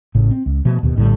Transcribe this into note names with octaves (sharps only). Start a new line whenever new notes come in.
A1 A2 C#3
C4
C#2
B2 F3 A3
D1 D#2 B2
A#1 A2 D3 G3